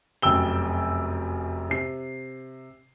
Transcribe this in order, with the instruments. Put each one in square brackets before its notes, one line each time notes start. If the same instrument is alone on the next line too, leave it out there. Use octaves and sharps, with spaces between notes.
[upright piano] F1 F#2 G5 E6 G7
C3 C7